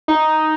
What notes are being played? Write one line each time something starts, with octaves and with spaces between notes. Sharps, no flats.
D#4